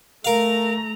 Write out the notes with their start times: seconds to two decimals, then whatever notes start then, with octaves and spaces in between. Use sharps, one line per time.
0.25 A3 A#4 F5 A#5